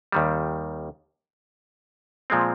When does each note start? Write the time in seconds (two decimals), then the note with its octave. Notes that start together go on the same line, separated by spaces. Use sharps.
0.12 D#2 D#3 G3
2.30 A#2 F3 G#3 C4